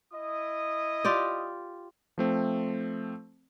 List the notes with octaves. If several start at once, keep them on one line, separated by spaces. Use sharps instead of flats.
E4 D#5 D#6
F4 G4 D5
F3 A3 C4